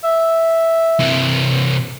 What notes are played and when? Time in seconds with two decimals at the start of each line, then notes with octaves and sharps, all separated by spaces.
0.04 E5
1.00 C3 E3